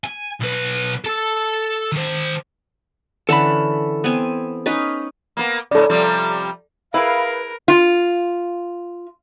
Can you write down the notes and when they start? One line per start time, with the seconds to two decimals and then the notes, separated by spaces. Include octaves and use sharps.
0.04 G#5
0.41 B1 B4
1.04 A4 A5
1.92 D#3 C5
3.29 D3 E3 C#4 A4 A5 B5
4.04 B3 C4 G#5
4.66 C#4 D#4 B4
5.37 A#3 B3
5.71 G#2 C#3 A4 D5
5.90 C3 F3 G3
6.94 E4 G#4 A#4 B4 F5
7.68 F4